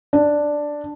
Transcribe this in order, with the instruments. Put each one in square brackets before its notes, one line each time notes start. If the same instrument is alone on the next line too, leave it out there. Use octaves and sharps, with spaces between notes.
[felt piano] D4